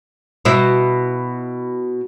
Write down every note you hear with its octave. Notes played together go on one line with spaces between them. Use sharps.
B2 E4